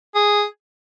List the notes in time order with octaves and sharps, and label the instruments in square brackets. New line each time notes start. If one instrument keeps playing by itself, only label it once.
[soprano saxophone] G#4